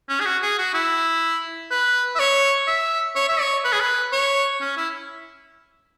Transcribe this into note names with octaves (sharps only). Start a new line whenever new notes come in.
C#4
G#4
F#4
G#4
F#4
E4
B4
E5
C#5
E5
C#5
E5
C#5
B4
G#4
B4
C#5
C#4
E4